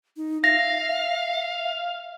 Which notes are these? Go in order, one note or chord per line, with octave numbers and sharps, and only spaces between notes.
D#4
E5 F5 A#6